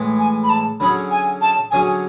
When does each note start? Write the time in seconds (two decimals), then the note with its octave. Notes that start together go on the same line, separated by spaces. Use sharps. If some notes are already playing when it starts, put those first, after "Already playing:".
Already playing: A2 E3 G#3
0.19 G#5
0.43 B5
0.50 A5
0.80 D3 F#3 C#4 G#4 B5
1.11 G#5
1.41 A5
1.71 D3 F#3 C#4 G#4 G#5